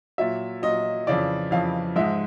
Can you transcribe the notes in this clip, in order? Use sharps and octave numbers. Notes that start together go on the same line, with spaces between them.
A#2 F#3 E5
A#2 F#3 D#5
F2 C#3 E3 D5
F2 C#3 E3 F5
G#2 F3 G#3 E5